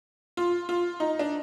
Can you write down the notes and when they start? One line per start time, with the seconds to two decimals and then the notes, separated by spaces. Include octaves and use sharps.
0.37 F4
0.69 F4
1.00 D#4
1.19 D4